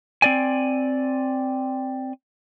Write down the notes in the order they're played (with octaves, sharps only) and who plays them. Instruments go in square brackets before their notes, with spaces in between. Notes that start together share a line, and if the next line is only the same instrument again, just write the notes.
[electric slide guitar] C4 D5 G#5